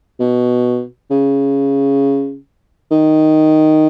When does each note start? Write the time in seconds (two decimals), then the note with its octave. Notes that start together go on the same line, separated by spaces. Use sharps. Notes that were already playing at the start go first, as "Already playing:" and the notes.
0.20 B2
1.11 C#3
2.91 D#3